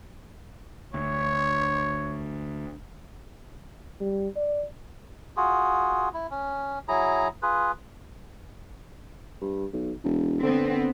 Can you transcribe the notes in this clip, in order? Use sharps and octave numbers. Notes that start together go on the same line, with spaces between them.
D2 C#5
G3
D5
F4 F#4 G#4
E4
C#4
F#3 E4 G#4 A#5
F4 G#4 B4
G2
B1
E1
D3 B3 C4